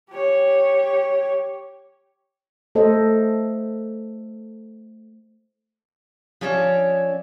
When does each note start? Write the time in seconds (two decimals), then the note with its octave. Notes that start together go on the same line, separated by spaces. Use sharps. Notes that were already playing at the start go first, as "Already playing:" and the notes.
0.11 G4 C#5
2.75 A3 A4 C5 D#5
6.41 F3 C#4 C#5 D5 E5